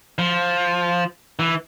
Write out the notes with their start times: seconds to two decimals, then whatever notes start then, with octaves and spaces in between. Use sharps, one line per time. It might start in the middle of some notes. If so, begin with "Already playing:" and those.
0.18 F3
1.39 E3